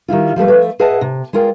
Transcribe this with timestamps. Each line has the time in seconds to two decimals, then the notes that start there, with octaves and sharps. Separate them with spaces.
0.08 D#3 G3 E4 F4
0.36 F3 G3 A3 B4
0.48 F3 A3
0.80 G#4 B4 D#5 E5 F#5 A5
1.01 C3
1.33 G#3 E4 F4 A#4 D5 G5